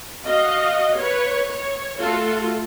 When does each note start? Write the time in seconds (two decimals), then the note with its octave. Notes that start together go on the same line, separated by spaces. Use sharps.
0.23 F#4 D#5 F5
0.95 B4 C#5
1.49 C#5
1.99 A3 F4 F#4 A4